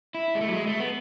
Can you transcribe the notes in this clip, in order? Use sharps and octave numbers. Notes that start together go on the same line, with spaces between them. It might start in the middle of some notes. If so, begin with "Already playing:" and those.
E4
G#3
A3
F#3
G#3
A3
B3